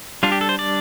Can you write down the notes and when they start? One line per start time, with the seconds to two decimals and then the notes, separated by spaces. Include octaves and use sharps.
0.23 G3 D4 F4
0.32 G4
0.41 A4
0.49 C5
0.59 D5